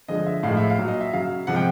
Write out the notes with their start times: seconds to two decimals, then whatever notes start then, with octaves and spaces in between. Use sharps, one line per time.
0.08 D3 F3 G#3 D#5
0.26 E5
0.43 A2 F3 G#3 F5
0.57 E5
0.70 F5
0.78 A#2 F#3
0.88 D#5
1.01 E5
1.13 C#3 F#3 F5
1.47 C3 F3 G#3 F#5
1.56 G5